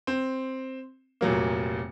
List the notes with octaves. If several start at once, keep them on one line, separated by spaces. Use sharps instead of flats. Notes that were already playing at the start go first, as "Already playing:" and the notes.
C4
F1 A#2 F#3 A#3